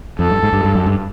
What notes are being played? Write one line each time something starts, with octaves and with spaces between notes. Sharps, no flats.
F2 A4
G2
G#2
G2
G2
F#2
G2